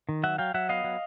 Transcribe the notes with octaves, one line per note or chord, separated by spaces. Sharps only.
D#3
F#3 E5 F#5
F#3 F5 G5
F#3 E5 F#5
B3 D#5 F5
F#3